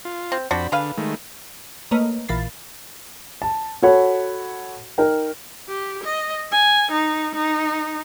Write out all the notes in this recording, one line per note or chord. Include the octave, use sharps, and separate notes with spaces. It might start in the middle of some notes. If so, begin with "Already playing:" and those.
F4
C4
F2 C4 D4 F#4 B5
D3 G#4 B4 F5
D#3 G#3 A3
A3 A#3 B4 C#5 D#5
A#1 A#2 E3 B5 A6 C7
A5
F#4 A4 C#5 F#5 B5
D#4 A#4 G5
G4
D#5
G#5
D#4
D#4